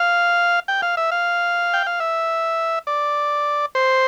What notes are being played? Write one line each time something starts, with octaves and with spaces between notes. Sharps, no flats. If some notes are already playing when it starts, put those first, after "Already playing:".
Already playing: F5
G5
F5
E5
F5
G5
F5
E5
D5
C5